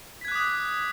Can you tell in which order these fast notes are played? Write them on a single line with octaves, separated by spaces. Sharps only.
B6 G#6 F#6 D6 D#6